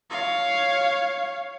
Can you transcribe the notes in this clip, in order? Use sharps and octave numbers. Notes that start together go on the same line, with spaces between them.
C#5 F5